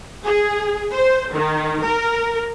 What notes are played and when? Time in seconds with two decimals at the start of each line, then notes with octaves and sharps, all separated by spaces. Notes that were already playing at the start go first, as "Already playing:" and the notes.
0.25 G#4
0.93 C5
1.33 D#3
1.84 A#4